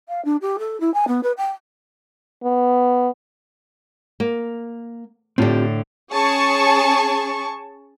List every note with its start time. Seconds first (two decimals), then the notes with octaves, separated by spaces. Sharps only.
0.09 F5
0.25 D4
0.41 G4
0.59 A4
0.80 E4
0.94 G#5
1.08 B3
1.23 B4
1.37 G5
2.44 B3
4.20 A#3
5.38 A2 D3 C4 F4 G4
6.12 C#4 G#4 A5 C#6